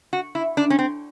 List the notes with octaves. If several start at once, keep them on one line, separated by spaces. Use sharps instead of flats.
F#4
E4
D4
C#4
C4